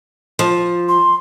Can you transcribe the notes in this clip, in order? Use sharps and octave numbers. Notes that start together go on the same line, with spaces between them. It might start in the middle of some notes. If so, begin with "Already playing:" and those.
F3
C6